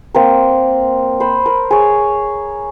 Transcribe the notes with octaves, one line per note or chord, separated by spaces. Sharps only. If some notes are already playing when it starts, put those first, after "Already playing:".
A#3 C4 A#4
C5 B5
A#4
G#4 C#5